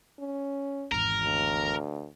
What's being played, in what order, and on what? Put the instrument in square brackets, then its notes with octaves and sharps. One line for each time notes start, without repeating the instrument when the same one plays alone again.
[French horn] C#4
[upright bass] G#1 E2 [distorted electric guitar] A#4
[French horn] D2